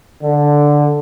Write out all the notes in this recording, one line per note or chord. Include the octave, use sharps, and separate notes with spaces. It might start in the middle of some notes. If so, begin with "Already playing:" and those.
D3